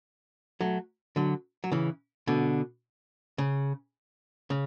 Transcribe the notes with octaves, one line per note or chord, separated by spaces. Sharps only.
F#3 A3
D3 F#3
F#3
C#3 E3
B2 D3
C#3
C#3